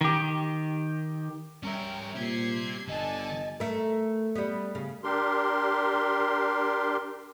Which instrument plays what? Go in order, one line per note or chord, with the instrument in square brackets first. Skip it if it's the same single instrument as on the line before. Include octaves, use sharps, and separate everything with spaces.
[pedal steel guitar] D#3 G4
[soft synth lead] G3 [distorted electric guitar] C#4 E5 [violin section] A#4 C#5 G5
[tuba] A#2 [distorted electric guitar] G4 C5 [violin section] G#6 C7
[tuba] G1 [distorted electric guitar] D3 A4 [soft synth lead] D#5 [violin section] G#5 A5
[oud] A3 A#4
G3 B3
C#3
[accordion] D4 G4 A#4 C6